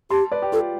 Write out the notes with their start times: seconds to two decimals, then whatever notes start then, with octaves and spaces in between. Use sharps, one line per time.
0.10 G4 A5 C6
0.32 B4 D5
0.42 G4
0.52 F4 A4